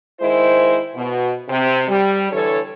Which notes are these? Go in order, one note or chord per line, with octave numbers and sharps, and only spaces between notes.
D#3 G#3 E4 C5
B2
C3
G3
D3 E3 A4 C#5